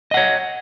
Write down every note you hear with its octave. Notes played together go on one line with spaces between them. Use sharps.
C#5 D#5 F#5